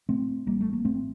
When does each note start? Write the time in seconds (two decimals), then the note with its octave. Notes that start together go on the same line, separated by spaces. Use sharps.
0.09 A2 A3 C4
0.46 A1 G3 A#3
0.61 A3
0.73 A#3
0.85 A2 A3 C4